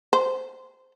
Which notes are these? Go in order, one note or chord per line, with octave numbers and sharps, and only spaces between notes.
C5